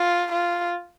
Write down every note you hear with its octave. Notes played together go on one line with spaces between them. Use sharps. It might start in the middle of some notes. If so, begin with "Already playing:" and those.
Already playing: F4
F4